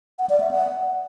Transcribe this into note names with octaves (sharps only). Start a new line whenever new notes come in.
F#5
D5
E5
F#5